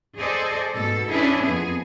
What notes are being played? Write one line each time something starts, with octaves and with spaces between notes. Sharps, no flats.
G#4 A4 C5 D5 D#5
G#2 B2 A4
C#4 D4 E4 G#4 B4
F2 B3 G#4